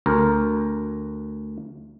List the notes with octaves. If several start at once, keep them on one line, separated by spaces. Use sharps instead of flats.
D2 A#4